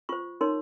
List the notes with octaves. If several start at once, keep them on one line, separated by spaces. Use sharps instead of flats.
F4 C5 C#6
D#4 A#4 C#5 C6